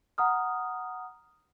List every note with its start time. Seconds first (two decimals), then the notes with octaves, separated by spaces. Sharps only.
0.18 F#5 A#5 D#6 F6